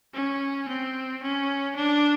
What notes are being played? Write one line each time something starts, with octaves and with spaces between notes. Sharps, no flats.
C#4
C4
C#4
D4